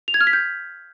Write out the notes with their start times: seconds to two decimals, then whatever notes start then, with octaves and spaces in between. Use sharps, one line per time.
0.08 F7
0.14 G#6
0.21 F6
0.27 B6
0.33 G6